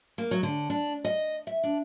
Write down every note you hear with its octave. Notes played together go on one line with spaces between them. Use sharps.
A#3
F#3
D3
D4
D#5
E5
D4